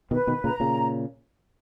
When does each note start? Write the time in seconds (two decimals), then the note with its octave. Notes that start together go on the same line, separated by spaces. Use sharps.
0.11 B2 D#3 B4
0.27 B2 D#3
0.44 A#2 C#3 A#5
0.60 A#2 C#3